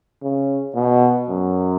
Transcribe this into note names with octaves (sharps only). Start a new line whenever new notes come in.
C#3
B2
F#2